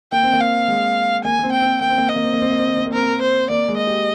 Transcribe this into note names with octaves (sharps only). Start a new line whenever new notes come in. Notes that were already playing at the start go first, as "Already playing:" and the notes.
A#3 G5
C4
A#3
F5
G#3
A#3 G#5
A#3
C4
G5
C4
A#3 G5
C4
A#3
C4 D#5
A#3
C4
A#3
C4
A#3
C4
A#3
C4
A#3
C4 A#4
A#3
C5
A#3 D5
G#3
D#5
G4